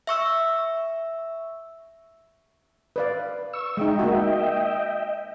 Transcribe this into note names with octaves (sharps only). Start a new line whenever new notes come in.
E5 C#6 E6
B4 D5 F5
C#6 E6
G#3 D#4 D#5 E5 G5
A#3 F#4